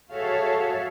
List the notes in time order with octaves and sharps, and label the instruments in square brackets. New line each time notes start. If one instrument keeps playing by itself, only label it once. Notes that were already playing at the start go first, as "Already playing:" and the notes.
[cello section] F#4 G#4 A4 C#5 E5 F5